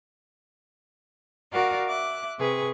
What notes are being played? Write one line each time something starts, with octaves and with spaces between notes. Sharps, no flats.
F#4 A#4 D5 F5 F#5
E5 D6 F#6
C3 G#4 B4 C#6